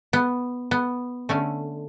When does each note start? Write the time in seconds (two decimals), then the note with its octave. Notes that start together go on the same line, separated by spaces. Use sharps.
0.13 B3
0.71 B3
1.29 D3 A3 C#4